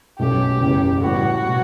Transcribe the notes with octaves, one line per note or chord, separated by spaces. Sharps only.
B1 B2 F#3 A3 C#4 G4
F#1 E2 C#3 E3 B3
A2 G3 B3 E4 F#4
B2 F#3